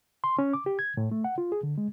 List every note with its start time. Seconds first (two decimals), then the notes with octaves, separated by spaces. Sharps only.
0.24 C6
0.39 C#4
0.53 D6
0.66 G4
0.79 G#6
0.97 A2
1.12 A3
1.24 F#5
1.38 F4
1.52 G#4
1.63 D3
1.78 G#3